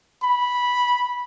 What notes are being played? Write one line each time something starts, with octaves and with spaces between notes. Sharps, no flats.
B5